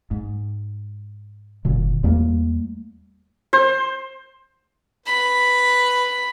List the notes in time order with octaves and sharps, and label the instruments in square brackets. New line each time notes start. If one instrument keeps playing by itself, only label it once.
[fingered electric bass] G#2
F#1 A#2 D3
E2 G3 A3 A#3
[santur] C5
[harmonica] B4 [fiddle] B5